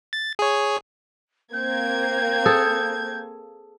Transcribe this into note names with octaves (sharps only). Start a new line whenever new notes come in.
A6
G#4 C#5
A#3 C4 G6 G#6
G#4 A4